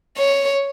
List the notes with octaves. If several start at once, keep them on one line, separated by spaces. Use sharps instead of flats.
C#5